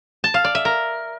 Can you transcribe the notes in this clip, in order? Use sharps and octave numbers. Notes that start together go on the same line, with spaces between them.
A5
F5
D5
E5
A#4